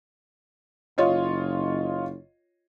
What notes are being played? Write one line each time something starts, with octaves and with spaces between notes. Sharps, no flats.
F#1 F4 C#5 D#5